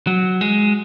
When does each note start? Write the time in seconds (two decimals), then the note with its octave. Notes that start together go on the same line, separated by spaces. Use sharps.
0.07 F#3
0.41 G#3